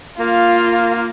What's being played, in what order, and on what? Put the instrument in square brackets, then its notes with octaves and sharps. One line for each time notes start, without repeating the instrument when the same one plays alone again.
[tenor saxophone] A#3 [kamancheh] F4